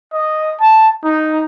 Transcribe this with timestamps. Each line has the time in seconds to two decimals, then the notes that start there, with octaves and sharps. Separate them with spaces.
0.13 D#5
0.60 A5
1.04 D#4